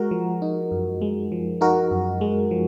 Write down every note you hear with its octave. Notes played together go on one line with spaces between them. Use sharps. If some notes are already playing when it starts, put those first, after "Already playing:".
Already playing: G#3 F#4 A#4
F3
D#4
F#2
G#3
F3
D#4 F#4 A#4
F#2
G#3
F3